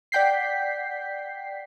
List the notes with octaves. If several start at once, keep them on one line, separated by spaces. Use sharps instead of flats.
D5 F#5 G5 G6 B6 C7